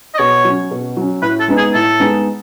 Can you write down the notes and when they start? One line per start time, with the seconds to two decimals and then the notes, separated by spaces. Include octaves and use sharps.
0.14 D#5
0.18 B2 C#5
0.45 F#3 C#4
0.71 B2
0.97 F#3 C#4
1.22 A2 B4
1.40 A4
1.48 G#3 B3 D#4
1.57 G#4
1.74 A2 A4
2.00 G#3 B3 D#4